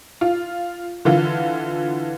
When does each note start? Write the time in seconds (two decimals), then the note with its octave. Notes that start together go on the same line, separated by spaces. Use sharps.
0.21 F4
1.05 D3 E3 F4